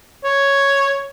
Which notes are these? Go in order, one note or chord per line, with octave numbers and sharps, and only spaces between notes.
C#5